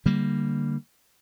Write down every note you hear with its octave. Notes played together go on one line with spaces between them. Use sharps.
D3 G3 A#3